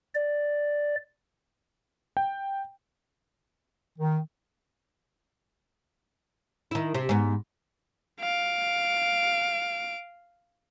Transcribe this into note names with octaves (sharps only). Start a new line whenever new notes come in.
D5
G5
D#3
D#3 E4
C3
G#2 B3
F5 D7